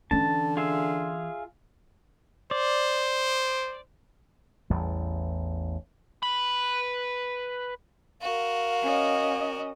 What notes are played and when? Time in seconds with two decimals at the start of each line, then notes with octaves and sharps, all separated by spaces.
0.11 D3 E3 C#4 A5
0.57 F4 G#4 E5
2.51 C5 D5
4.70 A1 E2 G3
6.23 B4 B5
8.22 F#4 A#4 F5
8.83 C#4 D#5